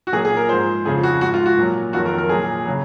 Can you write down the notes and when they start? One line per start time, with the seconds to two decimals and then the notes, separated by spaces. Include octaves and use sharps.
0.07 F#4
0.12 A#2 F#3 G#4
0.25 G#4
0.37 A#4
0.49 G#2 F3 C5
0.85 F2 C#3 F3 G#4
1.03 F#4
1.21 G#2 F3 F#4
1.34 F4
1.46 F#4
1.58 A#2 F#3
1.93 F2 D#3 F#3 F#4
2.06 A#4
2.18 A#4
2.29 A#2 F#3 G#4
2.65 C#3 F#3